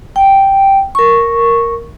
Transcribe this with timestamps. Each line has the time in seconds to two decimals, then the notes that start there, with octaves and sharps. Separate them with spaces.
0.16 G5
0.95 A#4 C#6